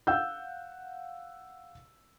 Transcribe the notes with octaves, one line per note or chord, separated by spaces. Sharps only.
F5 F#5 E6 G6